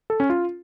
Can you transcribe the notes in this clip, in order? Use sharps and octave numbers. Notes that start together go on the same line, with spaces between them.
A4
C#4
F4